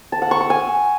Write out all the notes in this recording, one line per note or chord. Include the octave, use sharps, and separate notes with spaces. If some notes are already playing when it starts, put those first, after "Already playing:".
A5
F#5
C#6
E6
G#5